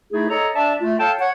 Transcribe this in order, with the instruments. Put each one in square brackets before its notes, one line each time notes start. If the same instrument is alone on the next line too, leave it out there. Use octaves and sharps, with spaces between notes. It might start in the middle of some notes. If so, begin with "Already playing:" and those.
[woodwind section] A3 D#4 E4 G#4
A4 C#5 D#5 A#5
D4 D5 E5 A5
A3 F4
A4 C#5 F5 G5 A5
C#5 F#5